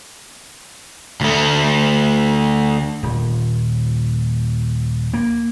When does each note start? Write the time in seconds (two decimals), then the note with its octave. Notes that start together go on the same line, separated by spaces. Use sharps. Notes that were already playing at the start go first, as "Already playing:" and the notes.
1.21 D2 A3
3.03 D#1
5.13 A#3